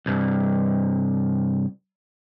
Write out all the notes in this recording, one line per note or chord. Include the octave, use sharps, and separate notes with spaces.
C2 G2